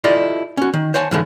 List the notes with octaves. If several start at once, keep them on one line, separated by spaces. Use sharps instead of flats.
E4 F4 G4 A4 D5 D#5
C#4 F#4
D#3
C5 C#5 F#5 G#5 A5
G#2 D3 E3 F3 G#3 A3